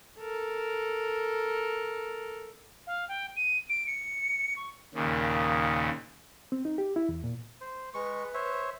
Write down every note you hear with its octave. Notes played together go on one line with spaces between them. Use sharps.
A4 A#4
F5
G5
D#7
D7
C#7
C#6
D#2 A#2 C#3
C4
D#4
G4
E4
E2
A#2
C5
G#3 B4 C#6
C5 C#5 E5